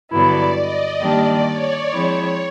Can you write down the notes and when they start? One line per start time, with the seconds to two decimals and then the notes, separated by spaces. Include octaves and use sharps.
0.11 G2 D3 F#3 B3 E4 D5
0.57 D#5
1.01 D#3 G3 A#3 D4 G4 D5
1.46 C#5
1.91 F3 G#3 C4 E4 C#5